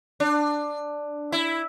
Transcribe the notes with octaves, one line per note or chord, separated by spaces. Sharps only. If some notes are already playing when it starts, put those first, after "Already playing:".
D4
E4